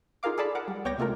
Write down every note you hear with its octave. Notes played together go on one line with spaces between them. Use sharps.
D#4 F4 G#4 A#4 F5 D6
G#4 A4 D5 A5 B5
A#4 F#5 D6
G3
C#2 B3 C#5 G5 D6 A#6
C3 G#3 A3 F4 A#4